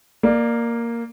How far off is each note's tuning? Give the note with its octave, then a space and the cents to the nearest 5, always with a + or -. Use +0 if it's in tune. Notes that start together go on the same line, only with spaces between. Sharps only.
A#3 +0 D5 +20